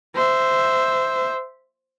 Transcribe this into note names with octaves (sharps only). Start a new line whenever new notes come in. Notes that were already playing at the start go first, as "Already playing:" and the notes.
C5 E5